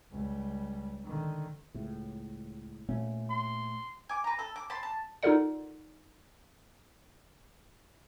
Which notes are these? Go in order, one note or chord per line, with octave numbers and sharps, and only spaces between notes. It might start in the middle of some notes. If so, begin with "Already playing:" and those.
C#2 G3
D3 D#3
C#2 A2
A#2 A3 C#4
C6
G#5 D6
B4 A#5
A4
D6
A5 B5 C6
A5
D#4 F4 A4 A#4 D5 F#5